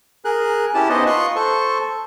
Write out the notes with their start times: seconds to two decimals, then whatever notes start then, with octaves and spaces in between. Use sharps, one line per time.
0.25 G#4 A#4 F#6
0.75 C#4 E4 G4 A5
0.89 B3 D#4 C5 D#5 F#5
1.07 F4 C6 C#6 D#6 F#6
1.36 A4 C5 C#6